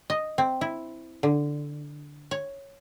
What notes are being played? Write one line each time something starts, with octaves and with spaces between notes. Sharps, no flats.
D#5
C4
E4
D3
C#5